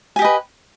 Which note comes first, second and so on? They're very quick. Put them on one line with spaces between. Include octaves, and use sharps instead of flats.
G#5 G4 D#5 B4